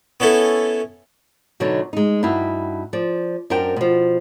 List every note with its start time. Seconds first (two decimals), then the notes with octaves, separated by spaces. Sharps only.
0.20 B3 C#4 E4 A4
1.60 B2 D3 F#3 D4 D#4 C#5
1.93 G#3 D#4
2.23 G2 D#4 E4 F#4
2.93 F3 D5
3.50 F#2 D4 F#4 A#4 C5 G5
3.76 B2 F3